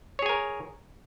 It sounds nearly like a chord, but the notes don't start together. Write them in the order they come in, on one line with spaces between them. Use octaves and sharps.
C#5 G#4 G#5 A#4